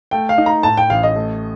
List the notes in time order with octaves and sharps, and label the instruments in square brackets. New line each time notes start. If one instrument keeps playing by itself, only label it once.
[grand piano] A3 [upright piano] G5
[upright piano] F5
[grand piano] D#4
[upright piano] A#5
[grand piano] A2 [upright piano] A5
[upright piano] G5
[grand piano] A1 [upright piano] F5
[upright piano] D#5
[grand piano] A3